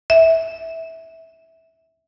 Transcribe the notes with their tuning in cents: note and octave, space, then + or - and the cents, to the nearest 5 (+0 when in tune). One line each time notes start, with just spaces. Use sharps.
E5 -15